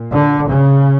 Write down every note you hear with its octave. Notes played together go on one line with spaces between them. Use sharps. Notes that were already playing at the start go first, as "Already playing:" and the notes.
Already playing: A#2
D3
C#3